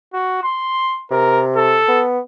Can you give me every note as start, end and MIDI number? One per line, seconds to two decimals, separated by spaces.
0.13 0.41 66
0.44 1.01 84
1.11 1.78 48
1.11 1.42 70
1.56 2.02 69
1.88 2.19 59